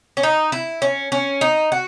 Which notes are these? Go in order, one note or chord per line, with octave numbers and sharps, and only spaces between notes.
C#4
D#4
E4
C#4
C#4
D#4
F#4